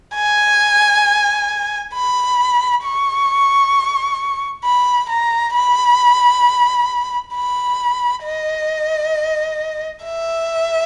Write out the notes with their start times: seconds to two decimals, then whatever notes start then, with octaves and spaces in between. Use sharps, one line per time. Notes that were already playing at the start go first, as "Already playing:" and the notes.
0.15 G#5
1.94 B5
2.84 C#6
4.64 B5
5.09 A#5
5.54 B5
7.34 B5
8.23 D#5
10.03 E5